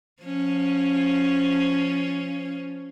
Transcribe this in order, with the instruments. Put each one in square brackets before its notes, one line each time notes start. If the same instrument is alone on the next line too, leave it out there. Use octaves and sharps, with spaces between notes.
[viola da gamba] F3 C#4